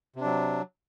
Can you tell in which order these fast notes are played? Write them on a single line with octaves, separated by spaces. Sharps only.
C3 D4 F#3